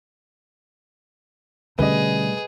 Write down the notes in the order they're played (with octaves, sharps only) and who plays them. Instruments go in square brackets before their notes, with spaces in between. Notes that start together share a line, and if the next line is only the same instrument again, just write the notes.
[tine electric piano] B2 G3 A3 [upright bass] D3 C#4 [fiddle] G#4 [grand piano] B4 D#5